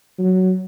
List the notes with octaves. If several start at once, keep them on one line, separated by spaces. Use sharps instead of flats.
F#3